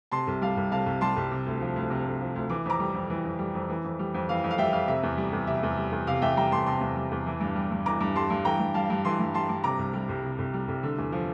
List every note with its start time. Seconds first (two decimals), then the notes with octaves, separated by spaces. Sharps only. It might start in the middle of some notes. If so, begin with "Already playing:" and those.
0.12 C3 A5 C6
0.27 C2
0.42 G3 F5 A5
0.57 C2
0.71 C3 F5 A5
0.86 C2
1.01 G3 A5 C6
1.17 C2
1.31 C3
1.46 D2
1.61 F3
1.76 D2
1.90 C3
2.05 D2
2.21 F3
2.35 D2
2.49 E3 D6
2.66 F2 A#5 D6
2.80 G3
2.95 F2
3.10 E3
3.25 F2
3.39 G3
3.55 F2
3.70 E3
3.84 F2
3.99 G3
4.14 F2
4.29 E3 F5
4.44 F2
4.51 F5
4.58 G3 E5 G5
4.73 F2 F5
4.88 C3 E5
5.03 E2
5.18 G3
5.33 E2
5.47 C3 E5
5.63 E2
5.77 G3
5.92 E2
6.07 C3 F5
6.22 E2 E5 G5
6.37 G3 G5 A#5
6.51 E2 A5 C6
6.66 C3 A5 C6
6.81 E2
6.96 G3
7.12 E2
7.26 E3
7.40 G2
7.55 G3
7.71 G2
7.86 E3 A#5 D6
8.01 G2
8.15 G3 A5 C6
8.30 G2
8.45 E3 G5 A#5
8.59 G2
8.74 G3 F5 A5
8.90 G2
9.05 E3 A5 C6
9.19 G2
9.34 G3 A5 C6
9.49 G2
9.64 C3 A#5 D6
9.78 C2
9.93 G3
10.09 C2
10.23 C3
10.38 C2
10.54 G3
10.68 C2
10.83 D3
10.98 E2
11.12 F3